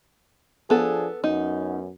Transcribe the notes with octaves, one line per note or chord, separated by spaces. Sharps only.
F3 B3 D4 G#4 A4
F#2 B3 C#4 D#4